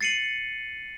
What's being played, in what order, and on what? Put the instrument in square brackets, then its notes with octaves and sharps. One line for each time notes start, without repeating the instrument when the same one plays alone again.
[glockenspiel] A6 C7 C#7 D#7 F#7